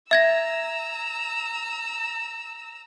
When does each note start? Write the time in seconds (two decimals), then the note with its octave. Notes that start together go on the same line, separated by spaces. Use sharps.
0.11 E5 A#5 E6 G#6 A#6